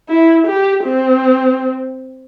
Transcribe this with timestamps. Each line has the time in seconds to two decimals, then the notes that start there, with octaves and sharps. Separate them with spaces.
0.09 E4
0.47 G4
0.84 C4